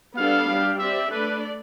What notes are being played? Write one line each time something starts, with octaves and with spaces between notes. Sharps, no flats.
G3 B3 D4 A4 F5
G3 D4 G4
C4 G4 D5 E5
A3 D4 A4 B4 D5